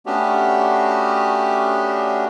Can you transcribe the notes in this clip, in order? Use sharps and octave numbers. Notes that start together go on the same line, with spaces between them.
A3 B3 C#4 D4 F#4 G4